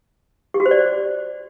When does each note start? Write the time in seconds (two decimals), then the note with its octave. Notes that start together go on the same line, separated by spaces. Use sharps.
0.54 G4
0.60 F#4
0.66 C5
0.71 D5